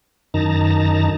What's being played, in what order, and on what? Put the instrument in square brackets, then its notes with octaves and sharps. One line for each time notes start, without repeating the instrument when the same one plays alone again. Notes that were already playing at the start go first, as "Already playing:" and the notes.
[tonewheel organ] F#2 D#3 D#4 A5 A#5